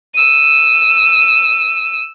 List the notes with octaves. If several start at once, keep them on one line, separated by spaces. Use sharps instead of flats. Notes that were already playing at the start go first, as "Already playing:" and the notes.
E6 D#7